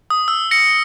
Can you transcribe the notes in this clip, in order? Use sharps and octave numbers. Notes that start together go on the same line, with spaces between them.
D#6
E6
A#6 C#7